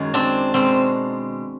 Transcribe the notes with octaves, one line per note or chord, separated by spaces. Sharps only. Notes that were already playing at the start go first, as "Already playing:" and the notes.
Already playing: F#2 D#3 G#3
C4 D4
B2 G#3 C4